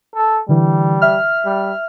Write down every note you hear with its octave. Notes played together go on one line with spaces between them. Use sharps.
A4
D3 E3 G3
E5 F6
G3